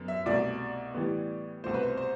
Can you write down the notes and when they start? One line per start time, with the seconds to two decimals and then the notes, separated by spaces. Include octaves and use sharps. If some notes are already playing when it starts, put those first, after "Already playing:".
Already playing: F#2 D3 B3
0.08 E5
0.26 C2 B2 A3 D5
0.94 A2 E3 G3 B3
1.64 C2 B2 A3 C5
1.74 B4
1.83 C5
1.97 C5